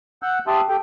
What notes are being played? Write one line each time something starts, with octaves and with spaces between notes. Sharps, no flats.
F#5 E6 F#6 G6
G4 E5 A5 C6 D#6
G4 A4 G5